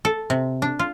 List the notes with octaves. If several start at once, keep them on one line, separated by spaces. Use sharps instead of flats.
A4
C3
D4
F4